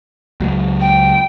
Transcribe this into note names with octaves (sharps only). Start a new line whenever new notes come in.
C#2 F#3
G5